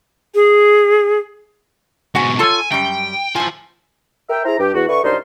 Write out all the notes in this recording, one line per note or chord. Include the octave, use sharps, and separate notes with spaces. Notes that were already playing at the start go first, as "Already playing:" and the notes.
G#4
G#2 B2 F#4 F#5 G#5
F4 A4 C#5 G#5 A5
F#2 G3 G5
A2 F4 C5 G#5
A#4 E5 G5
E4 G#4 C5 A#5
G2 G4
E2 F#4
D3 B4 E5 C#6
C2 F#2 D4 D#4 F4 C5